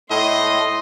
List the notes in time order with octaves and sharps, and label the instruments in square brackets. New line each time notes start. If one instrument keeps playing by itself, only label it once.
[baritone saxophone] A2 [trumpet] D#5 [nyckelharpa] C6